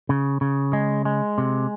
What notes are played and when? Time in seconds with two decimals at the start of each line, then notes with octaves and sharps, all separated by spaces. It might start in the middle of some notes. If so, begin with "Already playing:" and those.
0.09 C#3
0.41 C#3
0.73 G#3
1.05 G#3
1.38 C3